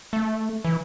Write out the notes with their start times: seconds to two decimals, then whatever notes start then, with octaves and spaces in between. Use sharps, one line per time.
0.13 A3
0.65 E3